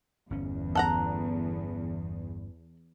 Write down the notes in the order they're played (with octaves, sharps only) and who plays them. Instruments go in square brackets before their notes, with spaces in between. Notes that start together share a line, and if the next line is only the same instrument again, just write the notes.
[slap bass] G1 C#4 [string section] E2
[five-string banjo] A4 F#5 A#5